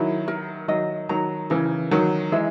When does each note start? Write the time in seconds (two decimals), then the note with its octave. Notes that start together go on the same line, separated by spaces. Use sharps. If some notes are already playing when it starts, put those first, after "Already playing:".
Already playing: D#3 F#3 E4
0.28 A#4
0.68 D#3 F#3 D#5
1.09 D#3 F#3 A#5
1.50 C#3 E3 A#4
1.91 D#3 F#3 A#4
2.32 E3 G#3 E5